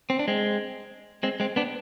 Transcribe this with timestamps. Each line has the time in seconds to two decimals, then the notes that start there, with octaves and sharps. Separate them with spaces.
0.10 C4
0.19 D4
0.28 G#3 C4
1.23 G#3 C4
1.40 G#3 C4
1.56 B3 D4